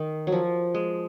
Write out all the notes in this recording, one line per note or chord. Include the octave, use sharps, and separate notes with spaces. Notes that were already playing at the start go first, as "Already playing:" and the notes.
Already playing: D#3
F#3
F3
G#3